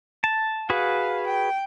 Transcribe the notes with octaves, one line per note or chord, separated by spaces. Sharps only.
A5
F#4 G#4 B4 F5
G5